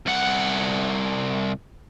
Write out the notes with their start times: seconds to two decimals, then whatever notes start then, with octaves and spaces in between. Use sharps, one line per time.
0.06 C2 F#5